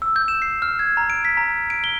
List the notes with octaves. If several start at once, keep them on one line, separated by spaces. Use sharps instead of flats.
E6
G6
E7
C7
F6
G#6
A#5
D7
B6
A#5
D7
G7